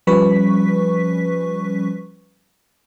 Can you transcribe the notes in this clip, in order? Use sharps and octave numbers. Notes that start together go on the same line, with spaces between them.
F3 G3 C#4 B4 C#6 B6